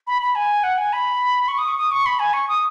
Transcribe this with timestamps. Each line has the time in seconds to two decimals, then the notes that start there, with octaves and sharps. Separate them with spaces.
0.07 B5
0.22 B5
0.35 G#5
0.63 F#5
0.78 G#5
0.93 B5
1.48 C#6
1.58 D#6
1.68 C#6
1.77 D#6
1.92 C#6
2.06 B5
2.19 G#5
2.33 C#6
2.48 D#6